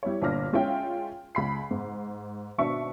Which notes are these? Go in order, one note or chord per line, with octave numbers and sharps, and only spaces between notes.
G3 E4 C#5
G1 A#2 D4 D6 F6 A#6
G#3 C#4 F4 E5 G5
C#2 B5 C7
G#2
G#1 B2 D4 E5 C#6